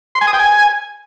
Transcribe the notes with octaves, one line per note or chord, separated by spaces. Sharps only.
C6
G#5
D#6
G5
G#5